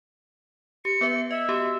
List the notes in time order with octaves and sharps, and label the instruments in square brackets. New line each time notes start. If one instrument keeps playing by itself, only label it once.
[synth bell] G4 [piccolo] C#7
[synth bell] B3 B4 E5
[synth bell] D#5 [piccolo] E5
[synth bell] B3 F#4 G4